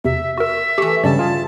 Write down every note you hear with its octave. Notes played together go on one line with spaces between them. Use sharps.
E2 C3 E5
F#4 A#4 E5
E3 A3 G4
G2 C#3 G3 D5 D#5 A5 E7
F4 G#4